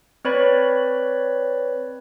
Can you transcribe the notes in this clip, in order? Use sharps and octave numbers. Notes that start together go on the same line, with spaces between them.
C4 B4 C#5 D5 B5